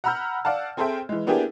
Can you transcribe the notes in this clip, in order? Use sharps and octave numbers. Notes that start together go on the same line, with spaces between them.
F#5 A#5 B5 E6 F6 G6
D5 F5 F#5 A5
C4 G#4 A4 C5 E5 G5
E3 G#3
A#3 B3 D4 E4 G4 G#4